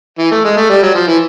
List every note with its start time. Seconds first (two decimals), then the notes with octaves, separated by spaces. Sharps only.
0.19 E3
0.31 A3
0.44 G#3
0.57 A3
0.69 G3
0.83 F#3
0.95 F3
1.08 E3